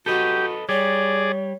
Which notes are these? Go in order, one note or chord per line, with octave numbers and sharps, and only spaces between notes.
F#4 G4 A4 B4 D#5
G3 G#4 C#5 D5